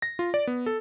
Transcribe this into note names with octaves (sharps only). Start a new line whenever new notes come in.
A#6
F4
D5
B3
A4